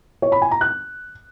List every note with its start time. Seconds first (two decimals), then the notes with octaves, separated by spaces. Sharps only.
0.22 C#5
0.32 B5
0.42 G#5
0.51 A#5
0.61 F#6